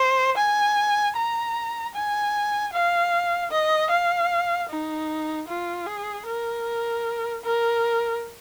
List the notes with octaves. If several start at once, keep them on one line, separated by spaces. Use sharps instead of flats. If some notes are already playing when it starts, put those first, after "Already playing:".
Already playing: C5
G#5
A#5
G#5
F5
D#5
F5
D#4
F4
G#4
A#4
A#4